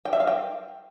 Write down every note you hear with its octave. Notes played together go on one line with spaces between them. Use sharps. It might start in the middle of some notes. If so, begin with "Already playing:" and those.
G5
E5
F5
G5